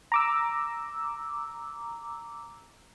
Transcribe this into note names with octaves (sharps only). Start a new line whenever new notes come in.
A#5 D6 E6